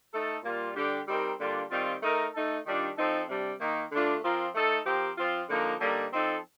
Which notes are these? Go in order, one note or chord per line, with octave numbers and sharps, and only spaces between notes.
A3 D#4 A4
A#2 G3 A#3 F4
D3 G3 D4 G4
G3 C4 D#4 A#4
D3 G3 A#3 D4 F4
D#3 G3 C4 F4
A3 D#4 A#4
A3 D#4 A4
D#3 G3 D4 F4
F3 C4 D#4 A4
C3 G3 D4
D#3 A#3 D#4
D3 A3 D4 F4
F3 C4 F4 A#4
A3 D#4 A4
F3 C4 G4 A#4
F3 C4 F4
D3 F3 A#3 D#4
D3 G3 A#3 D#4 A4
F3 C4 D#4 A4